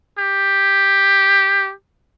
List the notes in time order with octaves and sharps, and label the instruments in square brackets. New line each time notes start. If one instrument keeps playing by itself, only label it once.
[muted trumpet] G4